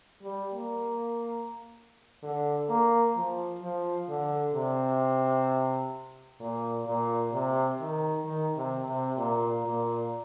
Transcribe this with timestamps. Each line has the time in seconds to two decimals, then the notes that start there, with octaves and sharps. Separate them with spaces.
0.23 G3
0.53 A#3
2.23 D3
2.69 A#3
3.16 F3
3.62 F3
4.09 D3
4.54 C3
6.40 A#2
6.87 A#2
7.33 C3
7.80 D#3
8.25 D#3
8.57 C3
8.88 C3
9.18 A#2
9.65 A#2